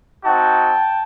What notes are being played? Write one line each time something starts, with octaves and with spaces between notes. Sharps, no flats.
C4 D#4 F#4 G5 A5